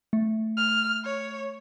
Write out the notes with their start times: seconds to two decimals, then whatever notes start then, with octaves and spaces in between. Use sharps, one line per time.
0.13 A3
0.57 F6
1.05 C#5